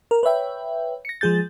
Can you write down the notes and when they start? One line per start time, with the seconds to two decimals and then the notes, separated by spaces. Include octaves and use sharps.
0.11 A#4
0.23 B4 C#5 E5 G5
1.05 A#6 C#7
1.21 F3 G#3 G#4 G6 A6